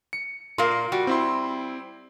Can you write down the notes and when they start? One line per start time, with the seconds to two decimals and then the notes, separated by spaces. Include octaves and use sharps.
0.13 C#7
0.58 A#2 A#3 C6
0.92 G3 F#4
1.07 C4 E4 C6